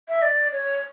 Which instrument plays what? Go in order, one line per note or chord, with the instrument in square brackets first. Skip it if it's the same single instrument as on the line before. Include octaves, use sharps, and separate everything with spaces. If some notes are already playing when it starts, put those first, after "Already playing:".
[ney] E5
D5
C#5